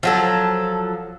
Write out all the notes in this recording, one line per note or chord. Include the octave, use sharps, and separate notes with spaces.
F3 F#3 A4